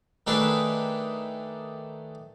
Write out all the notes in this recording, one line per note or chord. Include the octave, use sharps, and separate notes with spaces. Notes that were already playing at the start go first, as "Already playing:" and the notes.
D#3 A3 D4 G#4 B4